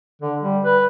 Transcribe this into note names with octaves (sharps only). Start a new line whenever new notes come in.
D3
G3
B4